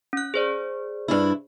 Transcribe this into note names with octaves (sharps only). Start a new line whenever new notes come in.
C#4 F#6
G#4 C5 D5
G2 D4 E4